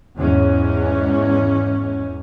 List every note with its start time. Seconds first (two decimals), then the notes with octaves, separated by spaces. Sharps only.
0.16 E2 G#2 C#4